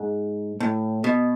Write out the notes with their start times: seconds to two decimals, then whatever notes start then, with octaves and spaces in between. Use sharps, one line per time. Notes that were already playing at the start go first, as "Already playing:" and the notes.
Already playing: G#2
0.60 A2
1.04 B2